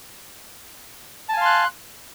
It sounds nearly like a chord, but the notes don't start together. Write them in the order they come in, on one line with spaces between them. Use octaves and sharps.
A5 G#5 F5 C6 F#6